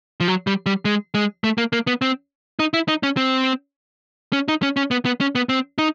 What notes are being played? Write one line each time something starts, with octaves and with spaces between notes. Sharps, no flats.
F3
F#3
G3
G3
G#3
G#3
A3
A#3
A#3
B3
C4
D#4
E4
D#4
C#4
C4
C#4
D#4
C#4
C#4
B3
B3
C#4
B3
C4
D#4